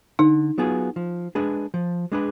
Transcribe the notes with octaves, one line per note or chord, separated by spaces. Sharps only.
D3 D#4
F#3 B3 F4 G#4
F3
G#3 D4 G#4 B4
F3
G#3 D4 G#4 B4